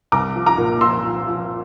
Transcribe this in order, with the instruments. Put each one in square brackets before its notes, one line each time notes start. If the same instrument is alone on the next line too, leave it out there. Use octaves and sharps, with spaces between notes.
[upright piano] C2 A#5 D6
F3
A#5 D6
A#2
F3 C6 E6
F3
F3